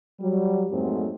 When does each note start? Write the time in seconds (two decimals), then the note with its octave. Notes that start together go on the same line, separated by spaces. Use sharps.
0.20 F#3 G3
0.70 F2 G#2 F#3 A3 A#3 C4